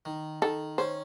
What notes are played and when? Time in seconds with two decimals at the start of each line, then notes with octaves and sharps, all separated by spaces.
0.05 D#3
0.42 D#3 A4
0.78 C#4 C5